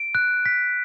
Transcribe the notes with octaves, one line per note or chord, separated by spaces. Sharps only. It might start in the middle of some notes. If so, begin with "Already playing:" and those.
Already playing: D7
F#6
B6